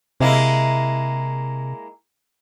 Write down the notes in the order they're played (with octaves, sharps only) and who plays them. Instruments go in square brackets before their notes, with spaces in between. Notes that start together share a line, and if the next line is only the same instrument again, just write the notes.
[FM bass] C3 [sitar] G#3 A#3 E4